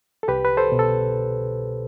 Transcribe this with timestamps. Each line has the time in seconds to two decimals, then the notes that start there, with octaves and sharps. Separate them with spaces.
0.23 A4
0.28 C2 G4 B4
0.45 B4
0.57 A4 C5
0.72 B2
0.79 A4